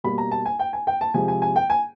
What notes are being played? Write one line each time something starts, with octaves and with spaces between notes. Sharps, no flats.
B2 G3 A#3 B5
A#5
A5
G#5
G5
G#5
G5
A5
C3 F3 G#3 C4 G#5
G#5
G#5
G5
G#5